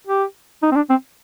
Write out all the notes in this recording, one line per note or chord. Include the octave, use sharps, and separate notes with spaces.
G4
D#4
C4
D4
C4